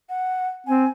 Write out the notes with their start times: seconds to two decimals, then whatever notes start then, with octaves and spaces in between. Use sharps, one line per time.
0.09 F#5
0.67 C4 G#5